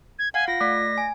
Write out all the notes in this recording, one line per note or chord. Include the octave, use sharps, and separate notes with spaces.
G#6
F5 F#5 G#5
F4 A#6
A3 D5 B6
G#5